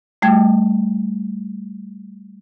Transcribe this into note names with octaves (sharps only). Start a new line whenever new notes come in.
G3 A3 G5 G#6